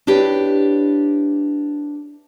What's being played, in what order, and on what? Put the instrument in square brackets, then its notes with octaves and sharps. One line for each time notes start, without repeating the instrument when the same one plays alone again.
[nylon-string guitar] D4 E4 G4 B4 C#5